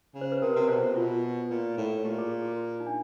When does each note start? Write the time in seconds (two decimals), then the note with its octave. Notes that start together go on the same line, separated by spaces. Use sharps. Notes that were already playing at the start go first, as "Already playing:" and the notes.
0.14 C#3
0.21 C5
0.32 B4
0.42 C3 A#4
0.55 C3 B4
0.69 B2 C5
0.82 C3 F#4
0.96 B2 F4
1.50 A#2
1.77 A2
2.05 A#2 G4
2.19 G#4
2.32 G#4
2.45 F#4
2.80 D#4
2.86 D4